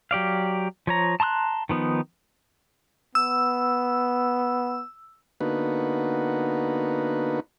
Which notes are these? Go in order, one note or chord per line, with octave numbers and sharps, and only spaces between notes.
F#3 G4 D5 F5
F3 C#5 A#5
A5 A#5 C6 D#6 F#6
D#3 F3 B3 D#4
B3 E6
D3 A#3 B3 D#4 F#4 B4